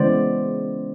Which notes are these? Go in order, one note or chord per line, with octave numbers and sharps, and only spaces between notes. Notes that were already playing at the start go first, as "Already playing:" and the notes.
Already playing: C#3 E3 G#3 B3 C5 D5